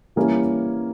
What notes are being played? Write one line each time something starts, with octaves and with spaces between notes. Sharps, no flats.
E3 G3 A#3 C#4 E4